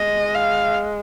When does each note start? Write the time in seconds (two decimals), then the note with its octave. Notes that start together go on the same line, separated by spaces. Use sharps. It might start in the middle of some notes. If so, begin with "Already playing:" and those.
Already playing: G#3 D#5
0.35 F5